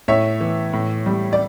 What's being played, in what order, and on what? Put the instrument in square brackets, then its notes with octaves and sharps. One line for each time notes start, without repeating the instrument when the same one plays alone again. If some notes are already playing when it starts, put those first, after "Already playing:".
[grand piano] A2 C#5 E5
E3
A2
G3
D5